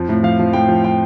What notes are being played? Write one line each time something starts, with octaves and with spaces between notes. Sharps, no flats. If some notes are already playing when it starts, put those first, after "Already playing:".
Already playing: F2 F3
A2
F3 F5
F3
A2 G5
F3
F3 G5